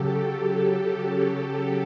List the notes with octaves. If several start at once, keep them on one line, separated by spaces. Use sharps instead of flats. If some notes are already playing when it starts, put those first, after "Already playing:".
Already playing: C#3 F#3 G4 A4